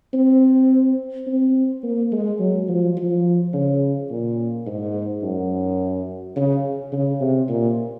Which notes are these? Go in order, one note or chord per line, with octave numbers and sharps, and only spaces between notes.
C4
C4
A#3
G#3
F#3
F3
F3
C#3
A#2
G#2
F#2
C#3
C#3
C3
A#2